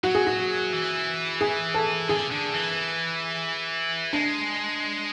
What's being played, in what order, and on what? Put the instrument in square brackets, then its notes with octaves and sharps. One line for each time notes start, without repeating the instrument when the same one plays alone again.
[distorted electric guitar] F#3 [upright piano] F#4
[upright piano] G#4
F#4
[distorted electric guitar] E3
[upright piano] G#4
A4
[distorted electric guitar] D3 [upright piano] G#4
[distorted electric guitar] D3
E3
[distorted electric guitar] G#3 [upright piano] D4